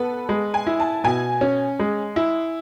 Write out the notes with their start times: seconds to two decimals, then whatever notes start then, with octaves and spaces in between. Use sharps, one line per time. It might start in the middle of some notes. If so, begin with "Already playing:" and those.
Already playing: B3 A4 B4
0.29 G#3
0.54 G#5
0.67 E4
0.80 A5
1.04 B2 G#5
1.41 C#4
1.79 G#3
2.16 E4